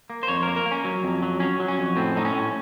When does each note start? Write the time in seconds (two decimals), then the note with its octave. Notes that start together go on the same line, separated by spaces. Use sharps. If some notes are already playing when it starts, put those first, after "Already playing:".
0.10 A#3
0.23 C5
0.28 F2 C#5
0.43 A#4
0.47 A#3
0.56 A#4
0.66 A#3
0.71 C#4
0.85 F#3
1.04 F2
1.23 F#3
1.40 F#3 C#4
1.60 F#3
1.68 C#4
1.78 F2
1.96 A2 C4
2.16 A2 D#4
2.25 C#4
2.33 A2